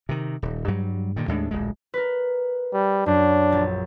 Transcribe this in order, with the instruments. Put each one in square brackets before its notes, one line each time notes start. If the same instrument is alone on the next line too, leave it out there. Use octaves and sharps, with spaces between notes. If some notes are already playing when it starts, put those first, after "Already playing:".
[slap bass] C3 D#3
D#1
G2 F#3 G3
G2 A#2 D3 D#3
D#2 A2 G#3 D4
D1 A#1 G#3
[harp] A#4 B4
[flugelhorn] G3
[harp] F#2 [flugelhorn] D4
[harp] A#1 A6